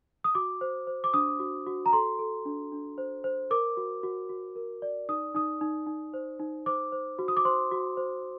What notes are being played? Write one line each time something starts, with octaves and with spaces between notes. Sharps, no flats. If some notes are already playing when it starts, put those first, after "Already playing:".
D#6
F#4 D6
C5
C5
D6
D4 D#6
F#4
F#4
A#5
A4 C6
A4
D4
D4
C5
C5
A#4 D6
F#4
F#4
F#4
A#4
D5
D#4 D#6
D#4 D#6
D#4
D#4
C5
D#4
C5 D6
C5
F#4
D#6
D6
C5 C6
F#4
C5